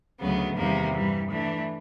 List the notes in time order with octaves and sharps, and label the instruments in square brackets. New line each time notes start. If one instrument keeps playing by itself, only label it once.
[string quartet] D2 C#3 F#3 B3
E2 C3 D#3 G3 A#3
G2 E3 G3
E3 A3 D4